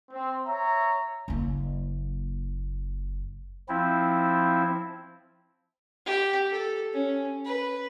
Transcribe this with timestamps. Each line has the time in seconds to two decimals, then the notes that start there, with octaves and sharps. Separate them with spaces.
0.11 C4
0.46 C#5 E5 A#5
1.28 F#1 A#3
3.69 F3 C4 E4
6.06 G4
6.50 A4
6.93 C#4
7.45 B4